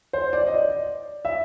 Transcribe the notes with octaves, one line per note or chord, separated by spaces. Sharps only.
C5
D5
D#5
D5
E5